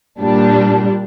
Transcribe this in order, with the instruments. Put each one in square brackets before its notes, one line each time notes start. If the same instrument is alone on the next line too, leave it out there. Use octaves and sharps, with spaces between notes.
[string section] A#2 G3 D4